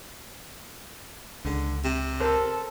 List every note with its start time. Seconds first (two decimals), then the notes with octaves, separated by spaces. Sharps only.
1.45 C#2 D3
1.84 C3
2.20 A4 A#4 C5